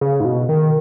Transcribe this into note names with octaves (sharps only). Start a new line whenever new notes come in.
C#3
G#2
B2
D#3